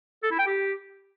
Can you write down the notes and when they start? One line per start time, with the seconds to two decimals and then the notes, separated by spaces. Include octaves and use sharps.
0.23 A4
0.31 E4
0.39 G5
0.47 G4